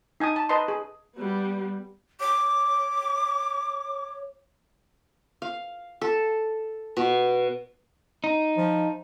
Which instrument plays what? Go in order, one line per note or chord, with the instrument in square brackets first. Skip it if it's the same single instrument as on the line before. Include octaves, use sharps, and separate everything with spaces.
[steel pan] D#4 G#5 A5 D#6
A5
B4 D#5 A5 A#5 C6
G#4
[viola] G3 B3
[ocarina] C#5 [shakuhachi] D6
[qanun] F5
A4
B2
[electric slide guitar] D#4
[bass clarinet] F3